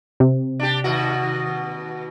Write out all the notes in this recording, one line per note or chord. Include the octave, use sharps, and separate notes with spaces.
C3
D4 G4
D#2 B2 F#4